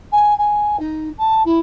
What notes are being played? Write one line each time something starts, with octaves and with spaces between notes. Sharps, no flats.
G#5
G#5
D#4
A5
E4